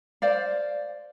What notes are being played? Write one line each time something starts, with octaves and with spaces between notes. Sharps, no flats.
C5 D5 F5